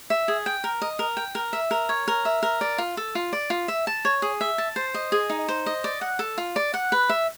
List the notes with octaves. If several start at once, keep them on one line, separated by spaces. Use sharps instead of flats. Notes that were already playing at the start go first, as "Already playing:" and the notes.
E5
G#4
G5
A#4
D#5
A#4
G5
A#4
E5
A#4
C#5
A#4
E5
A#4
D5
F4
A4
F4
D5
F4
E5
A5
C#5
G#4
E5
A5
C5
D#5
G#4
D#4
C5
D#5
D5
F#5
A4
F4
D5
F#5
B4
E5